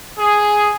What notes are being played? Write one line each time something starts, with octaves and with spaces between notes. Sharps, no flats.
G#4